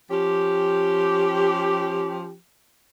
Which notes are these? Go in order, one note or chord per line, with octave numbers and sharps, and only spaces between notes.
F3 C#4 G4